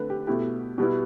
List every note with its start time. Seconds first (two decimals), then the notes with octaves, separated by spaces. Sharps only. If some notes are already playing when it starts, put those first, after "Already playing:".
Already playing: D3 A3 C4 B4
0.10 G4
0.27 B2 A3 E4 G4
0.78 B2 G3 B3 E4